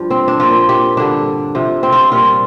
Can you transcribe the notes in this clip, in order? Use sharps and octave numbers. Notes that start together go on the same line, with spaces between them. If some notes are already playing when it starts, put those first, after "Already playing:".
Already playing: G2 F3 D4
C4
D4
A#2 F3 F4
G4
G2 D3 G3 D4
C3 F3
C4
F4
A#2 G3 F4